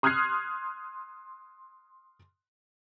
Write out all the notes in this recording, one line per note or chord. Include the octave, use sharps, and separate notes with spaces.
C6 D#6 F6 F#6 G#6 C7